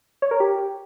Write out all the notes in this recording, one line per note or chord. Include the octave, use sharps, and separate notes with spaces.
C#5
A#4
G4